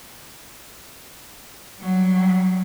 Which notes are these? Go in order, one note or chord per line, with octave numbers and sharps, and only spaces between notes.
F#3 G3